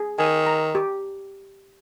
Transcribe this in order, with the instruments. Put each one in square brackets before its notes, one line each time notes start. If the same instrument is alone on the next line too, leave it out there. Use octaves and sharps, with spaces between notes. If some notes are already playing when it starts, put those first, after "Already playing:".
Already playing: [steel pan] G#4
[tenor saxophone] D#3 [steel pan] G#5
[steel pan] A#5
G4